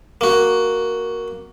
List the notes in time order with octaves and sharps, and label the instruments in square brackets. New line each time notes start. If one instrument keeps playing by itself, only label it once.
[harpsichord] A#3 F#4